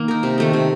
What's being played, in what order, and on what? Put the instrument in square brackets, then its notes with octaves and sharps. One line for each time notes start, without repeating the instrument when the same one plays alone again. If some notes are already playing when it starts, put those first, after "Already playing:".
Already playing: [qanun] D#3 A#3
D#4 A#4
C3
D#3 A3 D#4
C3